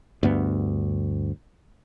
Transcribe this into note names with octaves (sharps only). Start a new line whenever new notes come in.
D2 G2 B3